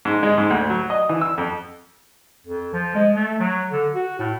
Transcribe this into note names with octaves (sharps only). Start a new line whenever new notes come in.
G#2
G#3
G#2
D2
F#3
D#5
E3
E6
F2
F2
F3
G#3
A3
F#3
D3
F#4
A2